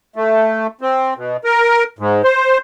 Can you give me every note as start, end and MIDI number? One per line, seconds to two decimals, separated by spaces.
0.16 0.67 57
0.81 1.14 60
1.17 1.37 47
1.44 1.83 70
1.99 2.22 44
2.24 2.58 72